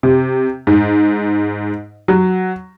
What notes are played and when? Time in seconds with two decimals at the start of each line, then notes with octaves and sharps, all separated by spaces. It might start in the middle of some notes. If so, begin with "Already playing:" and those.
0.03 C3
0.67 G#2
2.08 F#3